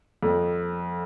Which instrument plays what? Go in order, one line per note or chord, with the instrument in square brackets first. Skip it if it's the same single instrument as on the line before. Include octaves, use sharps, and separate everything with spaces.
[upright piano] F2